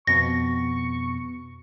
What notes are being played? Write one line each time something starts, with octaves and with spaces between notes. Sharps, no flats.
F2 B2 B3 C#6 A#6